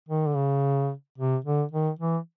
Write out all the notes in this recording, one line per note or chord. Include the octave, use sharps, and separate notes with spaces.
D#3
D3
C#3
C3
D3
D#3
E3